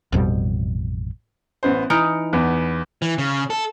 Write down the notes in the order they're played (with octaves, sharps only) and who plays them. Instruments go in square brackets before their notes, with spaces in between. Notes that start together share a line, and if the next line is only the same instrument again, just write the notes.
[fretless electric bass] A1 F2 B2 G3
[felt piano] A1 B3 C5
[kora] E3 D#4 [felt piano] F6 C#7 D7
[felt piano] E2 B3
[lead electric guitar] E3
C#3
A4